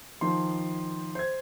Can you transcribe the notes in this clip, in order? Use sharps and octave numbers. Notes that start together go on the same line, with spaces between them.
D#3 F3 C6
C5 G#6